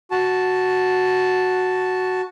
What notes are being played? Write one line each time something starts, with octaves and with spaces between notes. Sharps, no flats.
F#4 A5